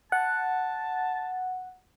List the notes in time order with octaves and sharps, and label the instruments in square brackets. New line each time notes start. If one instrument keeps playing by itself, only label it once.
[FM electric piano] F#5 [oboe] A5